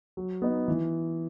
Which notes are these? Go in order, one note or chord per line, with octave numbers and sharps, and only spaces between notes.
F#3
B3 D#4
E3